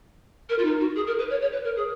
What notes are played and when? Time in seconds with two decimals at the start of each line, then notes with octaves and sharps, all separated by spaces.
0.49 A#4
0.58 F4
0.64 D#4
0.80 F#4
0.95 G#4
1.07 A#4
1.19 B4
1.30 C#5
1.41 C#5
1.52 B4
1.64 A#4
1.76 G#4